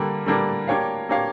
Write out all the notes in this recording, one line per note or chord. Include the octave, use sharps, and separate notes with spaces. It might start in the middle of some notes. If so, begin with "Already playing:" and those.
Already playing: D3 G3 A#3 D4
D3 G3 A#3 D4
A#3 D4 G4 C#5 F5
A#3 D4 G4 C#5 F5